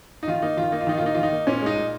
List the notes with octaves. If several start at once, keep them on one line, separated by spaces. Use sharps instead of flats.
D#4
D#3 F4
A#3 D#4
D#3 F4
A#3 D#4
F4
D#3 D#4
F4
A#3 D#4
D#3 F4
D#4
A#3
A#2 C#4
G#3 D#4
A#2